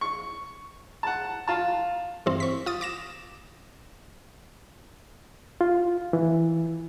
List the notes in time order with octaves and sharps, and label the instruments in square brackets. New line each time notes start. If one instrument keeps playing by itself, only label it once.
[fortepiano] C#6
F#5 A5
F4 A5
[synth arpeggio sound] G2 E3 C4
C#6 B6
F4 D#6 A6
D6 A#6 E7
[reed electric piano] F4
E3